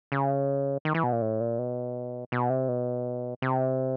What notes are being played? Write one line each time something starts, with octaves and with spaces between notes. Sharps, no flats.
C#3
D#3
E3
B2
A#2
A2
A#2
B2
B2
C3
B2
C3